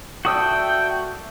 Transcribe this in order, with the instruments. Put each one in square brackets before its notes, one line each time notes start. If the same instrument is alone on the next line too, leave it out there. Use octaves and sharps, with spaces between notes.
[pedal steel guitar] F#4 D#6 E6 [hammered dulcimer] A4 D5 E5 [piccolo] G5